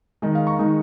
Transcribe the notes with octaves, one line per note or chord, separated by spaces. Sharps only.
D#3 G#3 D#4 D#5
F5
A#5 C#6
D#3 G#3 D#4